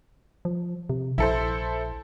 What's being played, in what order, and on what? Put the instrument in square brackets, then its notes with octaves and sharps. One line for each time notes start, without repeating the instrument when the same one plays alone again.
[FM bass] F3
C3
[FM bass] A#1 [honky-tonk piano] E4 A4 C5